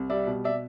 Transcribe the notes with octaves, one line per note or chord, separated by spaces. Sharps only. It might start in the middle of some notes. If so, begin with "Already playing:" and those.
Already playing: C2
G3 D5 E5
B2
D5 E5